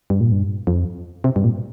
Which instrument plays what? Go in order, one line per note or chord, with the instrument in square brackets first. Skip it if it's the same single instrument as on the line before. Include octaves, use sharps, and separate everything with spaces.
[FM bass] G2
A#2
G2
F2
C3
G2
A#2